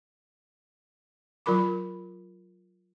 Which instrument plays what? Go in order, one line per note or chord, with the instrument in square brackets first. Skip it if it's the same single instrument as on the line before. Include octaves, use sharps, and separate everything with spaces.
[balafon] F#3 F4 A#4 B5 D6